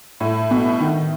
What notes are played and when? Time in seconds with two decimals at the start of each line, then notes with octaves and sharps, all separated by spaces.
0.20 A2
0.51 B2
0.80 D#3